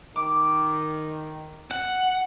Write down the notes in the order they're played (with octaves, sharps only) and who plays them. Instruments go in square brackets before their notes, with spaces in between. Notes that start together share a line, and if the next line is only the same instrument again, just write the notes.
[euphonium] D#3 [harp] D6
[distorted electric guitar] F#5